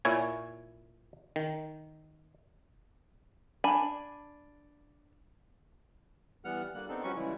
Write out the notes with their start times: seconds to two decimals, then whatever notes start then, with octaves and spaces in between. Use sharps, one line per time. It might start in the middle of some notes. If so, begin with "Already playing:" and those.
0.05 A#2 E4 C#5 G#5
1.36 D#3
3.64 D4 G#5 B5
6.45 E3 G3 B3 F#5 F6
6.74 D3 G3 A#3 F#6
6.89 B3 C4 D4 D#4 A4
7.03 F3 G3 C#4 F#4 B4 C#6
7.15 C#3 E3 G3 G#3 E4